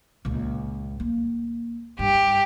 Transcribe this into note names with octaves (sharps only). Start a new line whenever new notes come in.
C#2 A#2
A#3
G2 G4